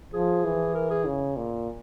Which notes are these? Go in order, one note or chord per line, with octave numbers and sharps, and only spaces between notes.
F3 G#4
E3
A#4
G#4
C#3
A#2